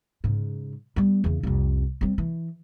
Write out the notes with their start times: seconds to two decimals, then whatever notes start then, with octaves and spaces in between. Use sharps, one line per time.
0.24 G#2 C#3
0.96 G3 B3
1.24 E2 C#3
1.43 C2 F2
2.01 G3 C4
2.18 E3